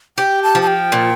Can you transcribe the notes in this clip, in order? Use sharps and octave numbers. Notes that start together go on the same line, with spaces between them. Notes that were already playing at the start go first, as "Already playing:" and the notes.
G4 G5
A5
F3
A5
G5
A#2